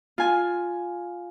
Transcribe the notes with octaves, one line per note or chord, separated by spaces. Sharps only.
F4 G#5